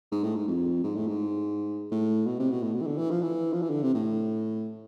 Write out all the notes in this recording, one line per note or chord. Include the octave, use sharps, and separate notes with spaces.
G#2
A2
G#2
F2
G#2
A2
G#2
A2
B2
C3
B2
A2
B2
E3
D3
E3
F3
E3
F3
E3
D3
C3
A2